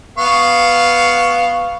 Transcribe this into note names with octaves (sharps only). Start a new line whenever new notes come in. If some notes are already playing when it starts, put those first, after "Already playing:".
B3 F5 C#6